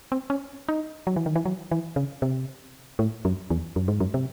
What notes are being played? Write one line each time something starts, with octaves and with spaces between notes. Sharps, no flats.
C4
C#4
D#4
F#3
E3
D#3
E3
F#3
E3
C#3
C3
A2
F#2
E2
F#2
G#2
F#2
C3